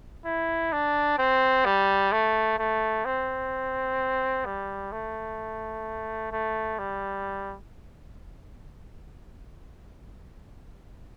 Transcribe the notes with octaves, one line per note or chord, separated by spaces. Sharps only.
E4
D4
C4
G3
A3
A3
C4
G3
A3
A3
G3